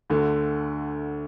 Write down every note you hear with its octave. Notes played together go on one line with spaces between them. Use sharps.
D2 D3 A3